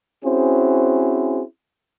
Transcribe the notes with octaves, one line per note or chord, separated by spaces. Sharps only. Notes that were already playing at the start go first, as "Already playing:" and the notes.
C4 C#4 E4 F#4 G#4 C5